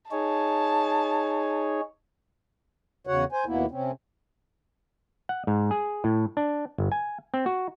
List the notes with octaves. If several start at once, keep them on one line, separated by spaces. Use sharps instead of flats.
D#4 G#4 C#5 A5
E2 C#3 F#4 C#5 F#5
C5 G#5
D#2 B2 A#3 B3 E4
C3 C4 C#4
F#5
G#2
G#4
A2
D4
G1
G#5
C4
F#4